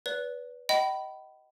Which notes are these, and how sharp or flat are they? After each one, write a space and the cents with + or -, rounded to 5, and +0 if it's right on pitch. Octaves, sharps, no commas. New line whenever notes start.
B4 -5 D5 -35
D#5 +5 G5 -40 B5 +0